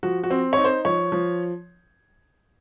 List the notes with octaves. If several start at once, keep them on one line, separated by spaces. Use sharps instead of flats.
F3 F#4
F#4
C4
D#4 C#5
C5
F3 C#5
F3